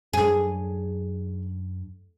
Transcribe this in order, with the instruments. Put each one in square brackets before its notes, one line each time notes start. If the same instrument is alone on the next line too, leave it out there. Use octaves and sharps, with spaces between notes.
[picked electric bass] F#2 F#3 D4 [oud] G#4